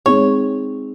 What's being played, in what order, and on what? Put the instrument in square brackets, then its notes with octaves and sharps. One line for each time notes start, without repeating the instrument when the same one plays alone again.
[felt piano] G#3 C4 D#4 G#4 [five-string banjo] C#5